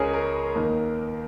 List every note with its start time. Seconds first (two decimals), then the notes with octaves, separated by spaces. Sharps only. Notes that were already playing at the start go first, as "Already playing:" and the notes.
Already playing: C#2 C#3 G#3 C#4 G#4 A#4 C#5
0.13 A#4
0.55 D#2 D#3 A#3